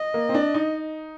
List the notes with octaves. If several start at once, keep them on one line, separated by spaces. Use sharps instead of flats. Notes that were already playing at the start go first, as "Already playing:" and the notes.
Already playing: D#5
A#3
C4
D4
D#4